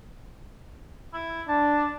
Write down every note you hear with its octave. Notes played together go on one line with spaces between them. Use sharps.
E4
D4 A5